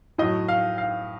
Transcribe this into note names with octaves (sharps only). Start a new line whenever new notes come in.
A2 F#3 D#5
F5
F5